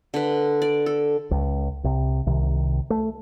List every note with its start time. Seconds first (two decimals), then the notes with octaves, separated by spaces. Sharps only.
0.14 D3 B4
0.62 D5
0.86 A4
1.31 C#2
1.84 C2 C3
2.26 C2 C3 D#3
2.90 A3